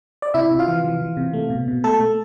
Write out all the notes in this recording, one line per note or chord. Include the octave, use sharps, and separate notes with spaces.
D5
C3 E4 E5
C3
F4 F5
E3
E3
E3
C3
A3
B2
B2
A3 A4 A5
A3